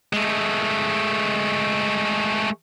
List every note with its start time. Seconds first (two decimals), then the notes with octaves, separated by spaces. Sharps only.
0.13 G#3 A3